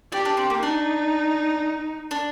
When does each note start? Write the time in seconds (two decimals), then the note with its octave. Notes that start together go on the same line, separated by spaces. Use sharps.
0.12 D4 G4
0.25 D4
0.37 C4
0.50 A#3
0.62 D4 D#4
2.11 D4